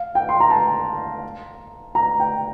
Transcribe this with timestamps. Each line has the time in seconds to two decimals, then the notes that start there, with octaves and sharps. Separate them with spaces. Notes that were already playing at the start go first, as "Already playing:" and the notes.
Already playing: F5
0.15 G5
0.29 C6
0.40 A#5
0.51 A5
1.95 A#5
2.20 G5